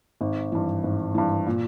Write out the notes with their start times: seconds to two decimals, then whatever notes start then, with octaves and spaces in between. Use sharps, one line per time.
0.21 G#1
0.52 G2 E3
0.84 G#1
1.15 G2 E3
1.47 A#2